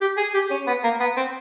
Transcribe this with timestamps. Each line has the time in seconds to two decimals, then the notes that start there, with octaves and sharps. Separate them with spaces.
0.01 G4
0.17 G#4
0.34 G4
0.51 C#4
0.67 B3
0.84 A#3
1.00 B3
1.17 C4